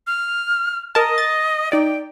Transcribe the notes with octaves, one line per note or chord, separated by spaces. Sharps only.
F6
A#4 D#5 A5
A6
D#4 D5 G5